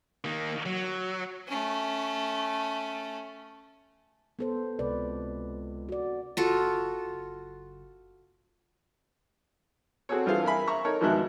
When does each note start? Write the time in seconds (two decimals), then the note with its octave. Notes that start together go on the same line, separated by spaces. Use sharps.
0.24 D#3 A#3
0.66 F#3
1.48 A3 C#4
4.39 B3 A4 C5
4.79 C#2 C3 B4 D5
5.89 F#4 D5
6.37 F#1 F4 F#4 A4
7.04 F#1
10.09 C4 F#4 G#4 A4 C#5
10.26 G2 E3 F4 G#4 C5 F5
10.44 A#4 E5 G#5 B5
10.67 E5 A#5 C#6
10.84 D#4 A4 A#4 C#5
11.01 F2 B2 D#3 G#3 E5 F#6